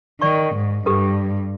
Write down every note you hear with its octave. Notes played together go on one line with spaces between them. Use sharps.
D#3 D5 C#6
G#2
G2 G4 A4 B4